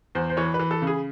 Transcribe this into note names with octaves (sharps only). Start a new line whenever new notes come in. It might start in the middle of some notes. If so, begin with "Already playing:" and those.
E2 C5
C5
E3 C#5
B4
E3
A4
C#3
G#4